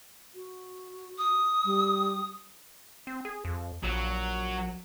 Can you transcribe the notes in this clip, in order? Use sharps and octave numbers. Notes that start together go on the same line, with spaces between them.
F#4
D#6
G3
C4
G#4
F2
A#1 F#3